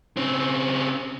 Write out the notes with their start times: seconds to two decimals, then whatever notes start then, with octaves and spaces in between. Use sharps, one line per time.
0.17 C#3 C4